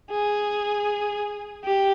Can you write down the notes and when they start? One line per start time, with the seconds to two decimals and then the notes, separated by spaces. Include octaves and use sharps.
0.11 G#4
1.64 G4